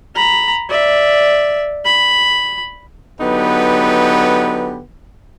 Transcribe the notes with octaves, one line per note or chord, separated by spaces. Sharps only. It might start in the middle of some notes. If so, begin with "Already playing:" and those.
A#5 B5
D5 E5
B5
D3 F#3 B3 D#4 G4 B4